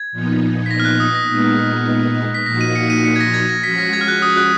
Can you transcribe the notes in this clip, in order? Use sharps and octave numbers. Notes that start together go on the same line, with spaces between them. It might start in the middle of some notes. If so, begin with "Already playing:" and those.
Already playing: G#6
A#2 F3 B3 D#4
B6
A#6
F6
F#6
D#6
A#6
A#2 G#3 B3 D#4
B6
A#2 F3 A#3 D#4 F#4 A#6
D#7
C#7
D#7
C#7
G#6
A#6
G#6
A#6
F3 G#3 C#4 F#4 B6
A#6
G#6
F6
F#6
D#6
F#6